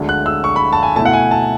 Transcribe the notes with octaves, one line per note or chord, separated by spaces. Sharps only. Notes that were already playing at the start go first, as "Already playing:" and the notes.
Already playing: D2 D3 G#3
F#6
E6
C#6
B5
A5
G#5
B2 A3 E4 A5
F#5
G#5
A5